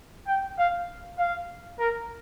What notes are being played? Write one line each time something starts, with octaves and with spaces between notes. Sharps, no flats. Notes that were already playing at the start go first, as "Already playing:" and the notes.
G5
F5
F5
A#4